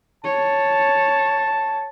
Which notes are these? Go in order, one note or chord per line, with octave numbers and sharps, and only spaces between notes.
C#5 A5